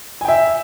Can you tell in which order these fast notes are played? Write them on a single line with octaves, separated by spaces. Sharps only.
G#5 G5 E5